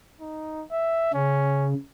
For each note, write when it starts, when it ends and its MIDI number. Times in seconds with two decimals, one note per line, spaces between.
0.21 0.64 63
0.71 1.09 76
1.14 1.74 49
1.14 1.69 61